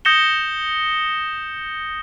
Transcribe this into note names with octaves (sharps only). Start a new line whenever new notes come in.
D#6 G6 A#6 C#7 E7 G7